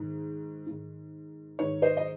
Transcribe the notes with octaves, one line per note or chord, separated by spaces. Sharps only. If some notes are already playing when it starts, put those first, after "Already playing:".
Already playing: G#2 D#3
G#2 D#3
G#2 D#3 C#5
C5 D#5
D#5